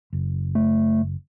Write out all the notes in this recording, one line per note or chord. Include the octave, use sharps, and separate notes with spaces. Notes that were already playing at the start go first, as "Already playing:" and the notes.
F#1
A3